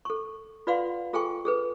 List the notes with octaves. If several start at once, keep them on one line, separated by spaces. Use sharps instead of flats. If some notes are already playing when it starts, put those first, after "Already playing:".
A4 C#6
F4 B4 D5 F5 F#5 C6
F4 G#4 A4 G5 G#5 C#6
G#4 A4 B4